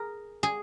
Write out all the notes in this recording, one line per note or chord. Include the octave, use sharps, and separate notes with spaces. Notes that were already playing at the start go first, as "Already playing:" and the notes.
Already playing: G#4 A#4
G#4